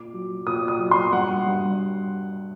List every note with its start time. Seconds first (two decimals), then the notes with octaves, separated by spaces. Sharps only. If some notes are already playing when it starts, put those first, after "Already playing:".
Already playing: A#2 D6
0.14 F#3
0.46 A#2 D#6
0.68 D#6
0.79 F#3
0.91 C6
1.13 G2 F#5
1.46 G2